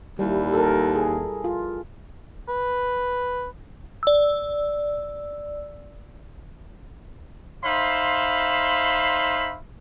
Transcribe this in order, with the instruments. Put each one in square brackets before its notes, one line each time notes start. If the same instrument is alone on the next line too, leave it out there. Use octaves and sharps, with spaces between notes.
[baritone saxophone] D#2 [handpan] G3 E4
[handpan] A4 A#4
G#4
F4
[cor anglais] B4
[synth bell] D5 E6
[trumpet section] D#4 C5 E5 F5 B5 C6